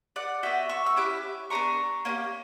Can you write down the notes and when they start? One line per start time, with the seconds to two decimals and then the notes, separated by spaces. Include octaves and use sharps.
0.16 D5 F#5
0.43 B3 F#4 E5 G5
0.69 C#6 E6
0.86 E6
0.96 C#4 E4 G4 D6 F#6
1.50 B3 D4 G4 A#5 C#6
2.05 A#3 C#4 E4 G4